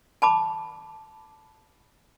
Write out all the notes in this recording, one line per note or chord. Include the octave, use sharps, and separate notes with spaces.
A5 B5 D6